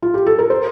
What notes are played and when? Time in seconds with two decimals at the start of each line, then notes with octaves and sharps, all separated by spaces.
0.02 F4
0.14 G4
0.27 A4
0.39 A#4
0.50 C5